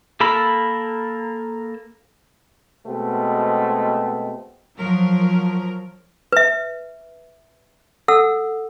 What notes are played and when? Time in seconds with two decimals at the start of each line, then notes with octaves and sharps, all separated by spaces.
0.20 A#3 A4 A#4 B5 E6
2.86 B2 G#3 A3 B3 C4
4.78 F3 F#3 A#4
6.32 B4 E5
8.08 A4 F#5 E6